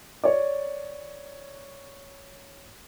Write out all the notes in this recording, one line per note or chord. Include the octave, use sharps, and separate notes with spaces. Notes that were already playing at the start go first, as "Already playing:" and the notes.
C#5 D5